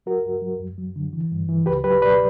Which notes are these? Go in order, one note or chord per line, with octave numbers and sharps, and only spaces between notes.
F#3 F#4 A#4
G2
F#3
F#2
F#3
D3
E3
G2
E3
C#2 G4 B4
F#3 G4 B4
B2 B4 D5